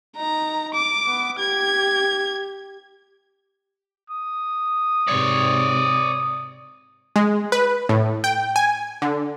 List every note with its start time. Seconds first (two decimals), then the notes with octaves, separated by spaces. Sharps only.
0.17 D#4 A#5
0.74 D6
1.07 B3
1.39 G4 G#6
4.10 D#6
5.08 G#2 C3 C#5 D5
7.16 G#3
7.52 B4
7.89 A2
8.24 G5
8.56 G#5
9.02 D3